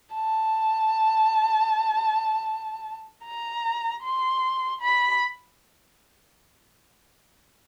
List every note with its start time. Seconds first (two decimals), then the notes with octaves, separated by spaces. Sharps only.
0.15 A5
3.25 A#5
4.03 C6
4.81 B5